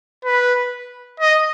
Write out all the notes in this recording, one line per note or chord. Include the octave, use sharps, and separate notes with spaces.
B4
D#5